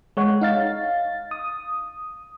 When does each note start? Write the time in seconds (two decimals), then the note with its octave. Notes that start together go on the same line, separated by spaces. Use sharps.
0.17 G#3 C#5 F#5
0.41 D#4 F5 A6
1.31 D#6